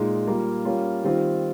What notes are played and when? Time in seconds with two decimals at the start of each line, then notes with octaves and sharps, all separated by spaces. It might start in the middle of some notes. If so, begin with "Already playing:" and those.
Already playing: A#2 G#3 D#4
0.27 G3 A#3 F4
0.65 G3 A#3 C#4 F4
1.04 D#3 G3 C4 F4